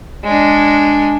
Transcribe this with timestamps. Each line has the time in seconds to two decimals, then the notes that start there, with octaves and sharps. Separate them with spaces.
0.24 G#3 D4